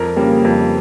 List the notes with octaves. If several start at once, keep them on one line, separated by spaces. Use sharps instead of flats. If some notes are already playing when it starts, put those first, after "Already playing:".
Already playing: F2 A#4
C#3 G3 A#3
F2